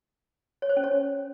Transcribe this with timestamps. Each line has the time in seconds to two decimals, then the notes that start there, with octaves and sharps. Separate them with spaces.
0.62 C#5
0.69 C5
0.77 C#4
0.84 C#5